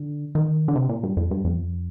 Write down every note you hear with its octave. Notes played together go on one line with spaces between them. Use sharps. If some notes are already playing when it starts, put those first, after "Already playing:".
Already playing: D3
D#3
D3
C3
A#2
G2
F2
G2
F2